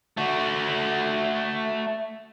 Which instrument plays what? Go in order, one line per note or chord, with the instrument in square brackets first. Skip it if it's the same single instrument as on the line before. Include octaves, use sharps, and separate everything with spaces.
[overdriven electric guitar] A3 F#4